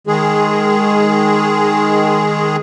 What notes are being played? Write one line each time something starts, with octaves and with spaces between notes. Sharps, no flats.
D#3 G#3 G#4